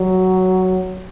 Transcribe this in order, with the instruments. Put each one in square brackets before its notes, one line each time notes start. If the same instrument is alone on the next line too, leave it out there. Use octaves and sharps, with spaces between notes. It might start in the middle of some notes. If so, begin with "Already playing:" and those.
Already playing: [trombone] F#3